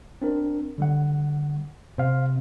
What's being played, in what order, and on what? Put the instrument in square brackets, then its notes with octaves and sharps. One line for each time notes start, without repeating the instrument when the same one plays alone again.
[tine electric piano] C4 D4 A#4
D3 G3 F#5
[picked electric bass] C3 [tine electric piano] C5 F5